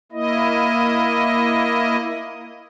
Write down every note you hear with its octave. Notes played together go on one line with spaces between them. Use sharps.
A#3 E4 D#5